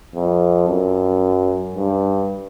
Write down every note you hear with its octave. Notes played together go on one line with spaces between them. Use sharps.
F2
F#2
G2